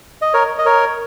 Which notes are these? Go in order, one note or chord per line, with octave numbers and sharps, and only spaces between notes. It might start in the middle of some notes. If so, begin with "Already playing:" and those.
D#5
A#4 C#5
D#5
A#4 C#5